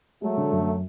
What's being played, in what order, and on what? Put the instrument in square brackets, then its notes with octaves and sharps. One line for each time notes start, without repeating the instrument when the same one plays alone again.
[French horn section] F#3 A3 [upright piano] G#3
[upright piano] D3
F#2